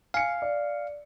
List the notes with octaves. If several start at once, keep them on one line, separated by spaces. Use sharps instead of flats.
F5 G#5 C#7
D5